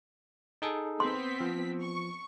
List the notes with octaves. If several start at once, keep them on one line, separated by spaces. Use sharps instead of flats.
D#4 G#4 A4
B3 C4 C6 B6
F3
C#6